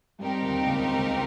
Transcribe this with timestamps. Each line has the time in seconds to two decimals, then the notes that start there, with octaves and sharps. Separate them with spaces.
0.19 G2 G3 C4 D#4 G4 A#4
0.43 D#2 D#3
0.66 C#2 C#3
0.90 C#2 C#3